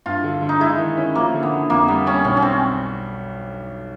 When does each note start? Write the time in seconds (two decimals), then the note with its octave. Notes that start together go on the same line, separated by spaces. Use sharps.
0.06 G2 F4
0.24 D3
0.42 D3
0.49 D#4
0.60 G#3 E4
0.78 D#3
0.97 C#4
1.15 F3 A#3
1.34 D3
1.43 B3
1.52 D3
1.69 F2 A#3
1.88 G3 B3
2.06 G3 C#4
2.24 B1 C#4
2.37 C#4
2.42 C4